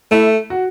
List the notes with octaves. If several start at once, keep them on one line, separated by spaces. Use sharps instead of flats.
A3 E4
F#4